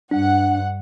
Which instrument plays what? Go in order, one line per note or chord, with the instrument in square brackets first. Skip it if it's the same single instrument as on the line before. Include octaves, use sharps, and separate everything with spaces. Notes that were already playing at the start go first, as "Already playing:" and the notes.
[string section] G2 F#5 [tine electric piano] D4